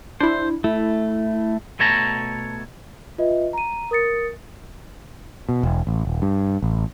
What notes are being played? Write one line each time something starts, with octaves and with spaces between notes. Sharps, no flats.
D4 E4 C5
A3 E4
B2 A3 C#5 A5 A#5
F4 B4 D#5 E5
A#5 D#7
A#4 D#6 A6 C#7
B2
E1
A1
D#1
G2
A1